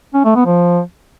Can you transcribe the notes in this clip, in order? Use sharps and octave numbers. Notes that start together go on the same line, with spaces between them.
C#4
A3
B3
F3